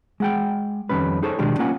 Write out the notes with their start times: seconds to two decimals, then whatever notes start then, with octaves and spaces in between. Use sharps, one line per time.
0.20 G#3 F#5 G5
0.89 F2 D#3 G3 C#4 B4
1.23 D#4 G#4 A4 C5 C#5
1.39 B2 D#3 G#3 D4 G4
1.59 A#3 C#4 F4 F#5 G#5